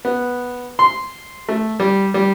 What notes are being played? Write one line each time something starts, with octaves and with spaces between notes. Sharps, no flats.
B3
C6
A3
G3
G3